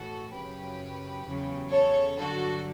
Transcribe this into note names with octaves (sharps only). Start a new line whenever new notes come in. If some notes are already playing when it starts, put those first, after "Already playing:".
Already playing: A2 E3 F#4 A4
F#2 C#3 F#3 G4 B4
E2 C#3 F#3
A4 C#5
G2 D3 F#3 F#4 A4